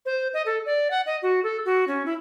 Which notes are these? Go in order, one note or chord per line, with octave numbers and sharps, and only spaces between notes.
C5
D#5
A4
D5
F#5
D#5
F#4
A4
F#4
C#4
E4